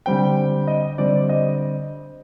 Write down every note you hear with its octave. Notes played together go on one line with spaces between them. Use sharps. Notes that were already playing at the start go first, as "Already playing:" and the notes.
D3 G3 C4 G5
D#5
D3 G3 C4 D5
D#5